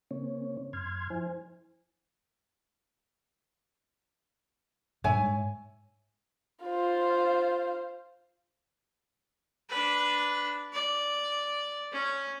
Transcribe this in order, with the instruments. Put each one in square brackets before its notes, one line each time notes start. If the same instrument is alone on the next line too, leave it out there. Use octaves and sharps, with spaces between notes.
[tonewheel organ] C#3 A#3 C4 C#4 C#5
F#2 C6 F6 G#6
F3 E4 C5 G#5
[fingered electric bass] G2 A#2 D3 [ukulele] C#5 E5 G#5
[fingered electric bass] G#2
[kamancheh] F4 C5
[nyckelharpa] D4 B4
D5
C#4